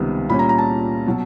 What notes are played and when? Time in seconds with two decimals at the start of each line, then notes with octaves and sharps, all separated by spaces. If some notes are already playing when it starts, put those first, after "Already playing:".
Already playing: C#2 C3 D#3 G3 B3
0.29 A#2 G3 A#3 C#4 B5
0.39 A#5
0.49 A#5
0.58 A5
1.06 B2 F#3